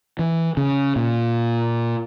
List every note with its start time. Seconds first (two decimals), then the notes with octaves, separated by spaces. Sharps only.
0.19 E3
0.57 C#3
0.96 A#2